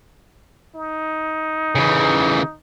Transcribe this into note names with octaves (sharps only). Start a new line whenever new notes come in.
D#4
C#3 E3